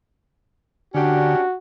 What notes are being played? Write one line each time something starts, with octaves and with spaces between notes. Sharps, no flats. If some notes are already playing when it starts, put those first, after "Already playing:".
D3 C#4 D4 F#4 G4